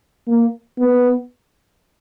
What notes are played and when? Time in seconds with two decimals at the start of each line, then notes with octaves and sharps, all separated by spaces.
0.28 A#3
0.79 B3